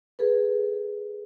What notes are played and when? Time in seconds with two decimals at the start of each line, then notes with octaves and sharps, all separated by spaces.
0.19 G#4 A4 B4